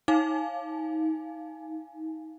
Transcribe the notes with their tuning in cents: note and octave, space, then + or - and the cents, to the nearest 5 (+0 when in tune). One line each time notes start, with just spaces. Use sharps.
D#4 +30 F5 -5 G#5 +0